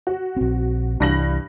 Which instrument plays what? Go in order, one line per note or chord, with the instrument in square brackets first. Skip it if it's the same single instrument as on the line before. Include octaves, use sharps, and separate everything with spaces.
[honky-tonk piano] F#4
[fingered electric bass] A#1 C4
[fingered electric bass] C2 E3 [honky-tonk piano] G2 A#6 F#7